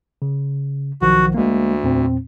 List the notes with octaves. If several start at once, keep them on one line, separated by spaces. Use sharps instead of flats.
C#3
B1 D#3 F3 F#4
D2 G#3 A#3
E2 A#2 C4